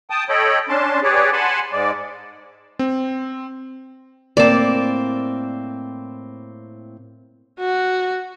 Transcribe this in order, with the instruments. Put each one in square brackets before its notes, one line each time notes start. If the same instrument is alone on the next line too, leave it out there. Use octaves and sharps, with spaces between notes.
[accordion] G5 A5 D#6
A4 C#5 D#5 G5 B5
C#4 D4 A5 C6
G4 G#4 B4 C#5 D5
F#5 G#5 A5 B5 C6
G#2 G#3 D5
[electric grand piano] C4
[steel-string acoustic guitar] A2 A#3 C4 [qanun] D5 A5
[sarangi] F#4